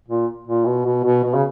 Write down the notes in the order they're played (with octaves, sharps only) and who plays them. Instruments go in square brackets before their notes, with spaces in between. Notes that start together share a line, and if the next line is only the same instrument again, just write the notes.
[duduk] A#2
A#2
B2
B2
B2
B2
C#3